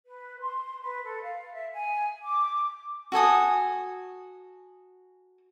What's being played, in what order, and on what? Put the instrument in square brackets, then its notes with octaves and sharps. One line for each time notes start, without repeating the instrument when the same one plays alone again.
[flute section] B4
C6
B4
A4
F5
E5
G#5
D6
[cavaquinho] F#4 A4 G#5 D#6